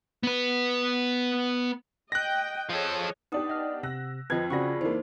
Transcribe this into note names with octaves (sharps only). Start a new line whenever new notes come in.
B3 B4
D#5 G5 F#6 A#6
F3 G#4 A4 C#5 D#5
B3 D4 D#4 G4 D#6
D#5 F#5 F6
C3 E6 F#6 A#6
F2 F3 B4 C5 D#5 G5 G#6
C#3 F4 F#4 G#4 D5 B5 C#6 A#6
E3 A#3 D#4 C5